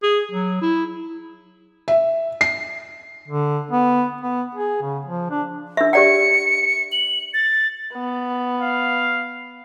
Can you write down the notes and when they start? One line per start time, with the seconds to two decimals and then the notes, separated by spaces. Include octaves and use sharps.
0.03 G#4
0.31 F#3
0.62 E4
1.88 E5
2.41 C7
3.28 D3
3.71 B3
4.21 B3
4.55 G#4
4.82 C#3
5.06 F3
5.31 D4
5.77 D4 E5
5.93 G4 D5 F#5 C#7
6.92 F#7
7.34 A6
7.94 B3
8.61 F5